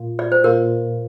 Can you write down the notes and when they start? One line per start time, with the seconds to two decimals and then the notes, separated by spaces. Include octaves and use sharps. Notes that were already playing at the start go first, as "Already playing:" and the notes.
Already playing: A#2 A#3 F4
0.19 D5
0.32 C5
0.44 A#2 A#3 F4 A#4